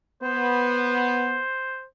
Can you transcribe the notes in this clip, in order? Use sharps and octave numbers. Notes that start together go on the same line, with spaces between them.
B3 C5